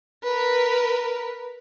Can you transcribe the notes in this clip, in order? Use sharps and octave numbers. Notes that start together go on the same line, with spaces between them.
A#4 B4